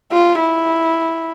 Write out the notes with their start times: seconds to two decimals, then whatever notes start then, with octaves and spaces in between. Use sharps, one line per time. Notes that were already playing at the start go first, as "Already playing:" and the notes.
0.12 F4
0.40 E4